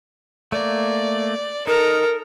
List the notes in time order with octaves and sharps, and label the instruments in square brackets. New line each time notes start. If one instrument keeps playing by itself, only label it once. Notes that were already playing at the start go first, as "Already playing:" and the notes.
[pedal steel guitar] A3 A#3 [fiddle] D5
[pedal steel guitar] D#4 [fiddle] A4 A#5 [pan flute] A#4